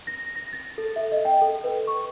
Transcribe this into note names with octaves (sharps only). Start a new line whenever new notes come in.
A#6
A#6
A6
A4
E5
D#5
G5
A4
B4
C#6